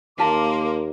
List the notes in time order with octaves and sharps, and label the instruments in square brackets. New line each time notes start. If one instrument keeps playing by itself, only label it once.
[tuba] D#2 [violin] A#3 [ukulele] A#4 A5 [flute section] F5 C6 D6